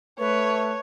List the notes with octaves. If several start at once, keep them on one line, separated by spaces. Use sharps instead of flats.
A3 B4 C#5